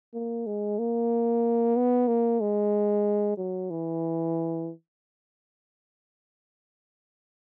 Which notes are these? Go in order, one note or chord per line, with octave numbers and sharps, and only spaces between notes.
A#3
G#3
A#3
B3
A#3
G#3
F#3
E3